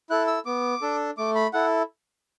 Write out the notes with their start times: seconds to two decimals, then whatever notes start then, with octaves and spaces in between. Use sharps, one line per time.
0.10 E4 A4 F#6
0.27 E6
0.46 B3 D6
0.81 D4 A4
1.18 A3 D6
1.35 B5
1.53 E4 A4 F#5